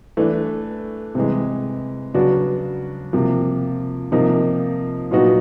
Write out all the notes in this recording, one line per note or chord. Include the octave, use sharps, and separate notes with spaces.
E3 A3 D4
C3 E3 G#3
C#3 F#3 B3 D4 F#4
C3 F3 A#3
C3 F3 A#3 D#4
A#2 F#3 B3 D#4 F#4